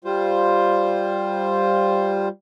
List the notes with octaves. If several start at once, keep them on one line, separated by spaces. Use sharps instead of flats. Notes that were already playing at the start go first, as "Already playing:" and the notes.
G3 F4 C5